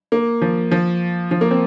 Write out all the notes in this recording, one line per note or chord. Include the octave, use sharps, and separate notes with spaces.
A#3
F3
F3
F3
A#3
C4